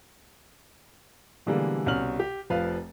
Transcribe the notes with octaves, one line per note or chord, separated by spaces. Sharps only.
B2 D3 E3 G3 G#3 A#3
C2 B2 C#4 F6 F#7
G4
F1 F3 B4 F5